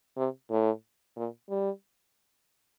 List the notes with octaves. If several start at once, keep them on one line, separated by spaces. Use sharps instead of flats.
C3
A2
A#2
G3